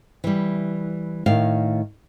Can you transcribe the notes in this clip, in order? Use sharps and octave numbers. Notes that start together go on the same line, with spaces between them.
E3 G3
A2 D#3 F5